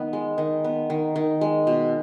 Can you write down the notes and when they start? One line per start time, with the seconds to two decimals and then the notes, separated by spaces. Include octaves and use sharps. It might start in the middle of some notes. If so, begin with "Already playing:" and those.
Already playing: D#3 B3
0.13 G#3
0.38 D#3
0.64 B3
0.90 D#3
1.16 D#3
1.41 G#3
1.67 B2